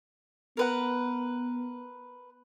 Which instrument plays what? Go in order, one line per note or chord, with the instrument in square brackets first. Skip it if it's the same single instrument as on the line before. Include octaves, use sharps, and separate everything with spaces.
[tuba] B3 [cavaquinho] A#4 B4 F#5